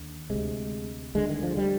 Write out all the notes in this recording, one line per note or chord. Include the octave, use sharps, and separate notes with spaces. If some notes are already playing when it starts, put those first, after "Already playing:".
Already playing: D#2 D3
D2 C3 G#3
D2 D3 G#3
D#3
F3
G3